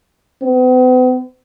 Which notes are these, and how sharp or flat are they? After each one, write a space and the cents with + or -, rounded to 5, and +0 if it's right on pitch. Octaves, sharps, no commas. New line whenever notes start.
B3 +45